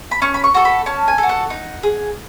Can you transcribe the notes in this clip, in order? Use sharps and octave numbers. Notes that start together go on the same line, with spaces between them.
B5
C#4 C#6
B5
C#6
F#4 A4 C#6
B5
C#4 A5
G#5
F#4 A4
F#5
D#4
G#4